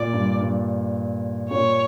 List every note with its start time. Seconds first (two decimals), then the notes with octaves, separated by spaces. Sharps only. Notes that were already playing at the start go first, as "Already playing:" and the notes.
Already playing: A#2 D5
0.13 G2
0.40 G2
1.50 A#2 C#5